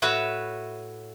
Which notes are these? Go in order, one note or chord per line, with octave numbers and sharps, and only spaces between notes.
A2 F#4 B4 C#5 E5